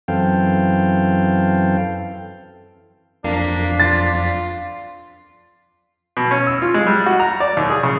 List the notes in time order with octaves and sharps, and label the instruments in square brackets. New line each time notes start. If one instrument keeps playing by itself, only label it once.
[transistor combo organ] F#2 E3 C4 A4 F5 G5
[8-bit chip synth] F2 B6 [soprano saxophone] A#3 [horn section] D4
[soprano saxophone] F4 [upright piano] A6
[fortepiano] B2
C#4
E6
F4
G#3
G3
F#4
A#5
D5
D#2
G#4
C#3